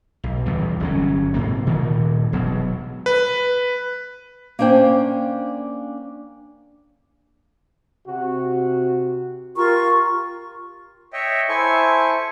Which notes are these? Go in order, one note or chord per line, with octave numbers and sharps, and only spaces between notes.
B1
B1 E2 G3
G1 F#3 C#4
G#2 C3 A#3
D2 G2 A#2 D#3
E1 B2 F#3
B4
A#3 C#4 D4 C5 G5
C3 F#4
F4 G4 A#4 C#6
C#5 D#5 E5 G5
E4 A4 C5 G#5 C#6